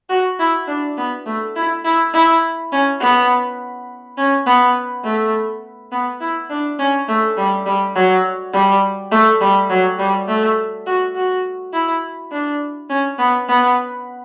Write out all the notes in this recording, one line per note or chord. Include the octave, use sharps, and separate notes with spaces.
F#4
E4
D4
B3
A3
E4
E4
E4
C#4
B3
C#4
B3
A3
B3
E4
D4
C#4
A3
G3
G3
F#3
G3
A3
G3
F#3
G3
A3
F#4
F#4
E4
D4
C#4
B3
B3